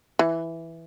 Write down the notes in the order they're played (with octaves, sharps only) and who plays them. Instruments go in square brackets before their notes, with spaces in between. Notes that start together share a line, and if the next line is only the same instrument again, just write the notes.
[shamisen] E3